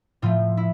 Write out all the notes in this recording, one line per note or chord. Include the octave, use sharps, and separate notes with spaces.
A2 F3 A3 F4
E4